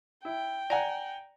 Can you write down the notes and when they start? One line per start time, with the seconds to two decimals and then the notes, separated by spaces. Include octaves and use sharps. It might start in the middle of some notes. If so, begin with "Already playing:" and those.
0.25 E4 G5
0.70 D5 F#5 G#5 A#5